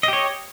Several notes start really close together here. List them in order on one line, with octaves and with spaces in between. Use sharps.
D#5 G4 C#5